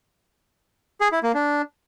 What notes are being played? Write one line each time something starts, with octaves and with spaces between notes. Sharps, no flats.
G#4
E4
A#3
D4